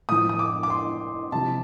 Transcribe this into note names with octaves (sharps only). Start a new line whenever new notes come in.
A2 F3 D#6
D#6
D6
D6
C6
C3 F3 A5